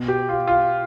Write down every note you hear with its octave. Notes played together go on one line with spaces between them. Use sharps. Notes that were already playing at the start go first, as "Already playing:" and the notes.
Already playing: B2
G4
F4
F4